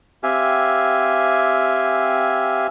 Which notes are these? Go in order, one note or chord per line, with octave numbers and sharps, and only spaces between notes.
C4 G4 E5 F5 G#5